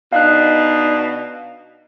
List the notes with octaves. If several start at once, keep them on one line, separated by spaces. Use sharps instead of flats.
B2 D4 D#4 F5 F#6